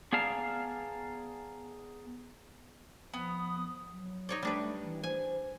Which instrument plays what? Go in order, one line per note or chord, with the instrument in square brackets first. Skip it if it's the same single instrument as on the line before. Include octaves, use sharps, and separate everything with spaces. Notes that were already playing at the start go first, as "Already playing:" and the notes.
[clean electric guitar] B3 G#4 D5 F5 A5 A#5
[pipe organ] F3 D#6 [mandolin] B3
[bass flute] F#3
[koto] D#4 C#5 D5
[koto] G3 D4 B4 [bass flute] A3
[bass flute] E3
[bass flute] C5 [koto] G#5